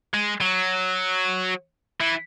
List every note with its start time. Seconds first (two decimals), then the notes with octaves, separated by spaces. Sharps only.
0.14 G#3
0.41 F#3
2.01 E3